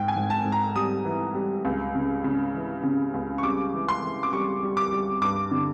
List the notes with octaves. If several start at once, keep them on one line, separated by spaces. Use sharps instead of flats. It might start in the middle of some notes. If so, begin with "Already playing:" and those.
Already playing: G#2 G5
G#5
G#2
A5
G#2
A#5
G3 D#6
E3
G3
C#2
C#3
C#3
E3
C#3
C#2
C#6
G3 D6
E3
C6
E3
D6
G3 C#6
G3
D6
G3
G2 D6
D3